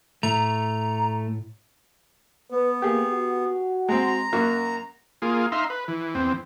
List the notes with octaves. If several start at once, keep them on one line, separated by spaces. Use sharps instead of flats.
A2 A3 A#5
B3 B4
A#3 G4 G#4
F#4
G#3 C4 A#5
F#2 A#3 F#4
A#3 F4 G#4
D#4 E5 F5 A#5 C6
B4
E3
E2 C4